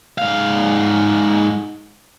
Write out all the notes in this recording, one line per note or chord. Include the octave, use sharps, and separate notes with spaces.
G#2 F5